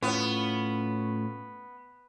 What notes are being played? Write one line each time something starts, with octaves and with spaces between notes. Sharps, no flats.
A2 B3 C#4 F4